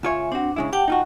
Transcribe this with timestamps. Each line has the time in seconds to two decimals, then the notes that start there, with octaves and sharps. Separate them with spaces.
0.03 C#2 F4 C#5 E5 G#5
0.32 C4 D4 F#4
0.56 C#3 G#3 E4
0.73 G4 F#5 G5 A5
0.88 D#4 F4 F#4